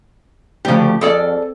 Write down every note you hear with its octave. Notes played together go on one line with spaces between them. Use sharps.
D2 C#3 F3 G4
F2 G#4 A4 D5